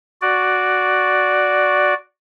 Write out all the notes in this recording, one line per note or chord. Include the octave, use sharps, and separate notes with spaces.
F#4 D5